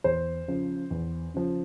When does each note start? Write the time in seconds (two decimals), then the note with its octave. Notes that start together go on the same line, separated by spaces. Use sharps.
0.04 E2 C5
0.48 C#3 F3
0.91 E2
1.34 C#3 F3